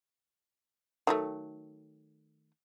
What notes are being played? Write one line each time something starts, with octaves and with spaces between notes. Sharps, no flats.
D#3 F#3 A3